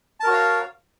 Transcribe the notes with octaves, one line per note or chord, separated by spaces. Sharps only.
F#4 A#4 C#5 F5 A5